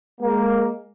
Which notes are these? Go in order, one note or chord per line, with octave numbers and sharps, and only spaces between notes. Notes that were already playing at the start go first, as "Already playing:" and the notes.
G#3 A#3